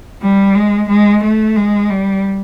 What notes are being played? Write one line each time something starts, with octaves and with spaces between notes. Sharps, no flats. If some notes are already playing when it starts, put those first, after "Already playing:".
G3
G#3
G#3
A3
G#3
G3